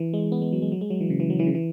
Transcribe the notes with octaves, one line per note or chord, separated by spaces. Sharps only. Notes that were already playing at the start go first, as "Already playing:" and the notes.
Already playing: E3
G#3
B3
G#3
F#3
G#3
F#3
G#3
F#3
E3
C#3
E3
F#3
E3
C#3
E3